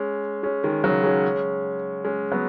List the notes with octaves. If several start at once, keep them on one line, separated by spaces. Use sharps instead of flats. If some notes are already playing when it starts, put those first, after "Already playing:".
Already playing: G#3 C#4
G#3 C#4
D#3 G#3
C#3 F#3
G#3 C#4
G#3 C#4
F#3 B3